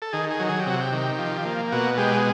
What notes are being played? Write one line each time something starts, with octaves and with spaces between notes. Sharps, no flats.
A4
D#3 G#4
G#4
F#3
G#4
G4
C3 F#4
G4
D#3
F3
A#3
B2 F#4
G#3 G4